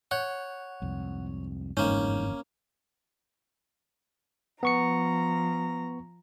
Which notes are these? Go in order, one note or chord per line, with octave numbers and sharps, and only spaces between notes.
C#5 F#5 F#6 G6
C2 F2 G#2
G1 F2 G#2 E3 A#3 C#4 G6
F3 B3 A#5 C#6 C#7